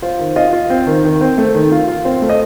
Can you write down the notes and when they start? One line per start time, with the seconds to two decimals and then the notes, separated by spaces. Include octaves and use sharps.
0.02 F4 C5
0.19 D#3
0.36 F4 D#5
0.53 F4
0.70 C4
0.87 D#3
1.04 D#3
1.21 C4
1.38 A3
1.54 D#3
1.72 F4
1.88 F4
2.05 C4 C5
2.22 A3
2.30 D#5